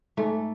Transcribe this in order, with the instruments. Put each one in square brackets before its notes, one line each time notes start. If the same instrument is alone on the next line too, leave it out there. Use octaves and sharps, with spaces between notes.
[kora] G#2 A3